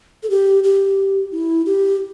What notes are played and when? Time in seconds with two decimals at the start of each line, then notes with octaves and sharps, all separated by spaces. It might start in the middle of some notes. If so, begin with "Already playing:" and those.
0.23 A4
0.30 G4
0.64 G4
1.32 E4
1.66 G4